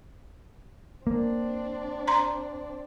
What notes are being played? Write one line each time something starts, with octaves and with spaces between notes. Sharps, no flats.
A#3 C4 D4
A#5 C6